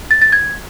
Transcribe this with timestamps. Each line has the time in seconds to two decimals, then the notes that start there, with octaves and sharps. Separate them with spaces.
0.11 A6
0.22 A6
0.33 G#6